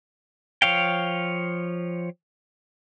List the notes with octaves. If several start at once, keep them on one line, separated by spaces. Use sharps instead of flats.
F3 C#5 F5 G5